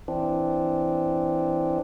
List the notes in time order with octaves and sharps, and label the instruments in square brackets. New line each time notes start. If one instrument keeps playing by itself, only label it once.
[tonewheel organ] E3 C4 D4